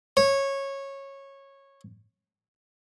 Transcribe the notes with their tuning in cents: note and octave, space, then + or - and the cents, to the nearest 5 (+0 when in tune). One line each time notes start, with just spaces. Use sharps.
C#5 -15